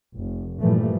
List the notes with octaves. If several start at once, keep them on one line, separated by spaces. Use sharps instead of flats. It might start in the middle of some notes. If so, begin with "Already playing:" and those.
F1
G2 A#2 E3 F3 G3 A3